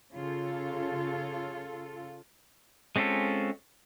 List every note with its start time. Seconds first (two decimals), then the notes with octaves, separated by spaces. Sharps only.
0.13 C#3 F4 A4
2.96 G#3 C4 C#4 F4 A4